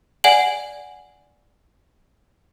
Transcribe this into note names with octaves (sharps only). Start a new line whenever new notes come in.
D5 F#5 G#5 F#7